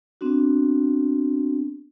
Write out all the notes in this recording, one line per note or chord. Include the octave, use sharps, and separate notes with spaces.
B3 C4 D4 F#4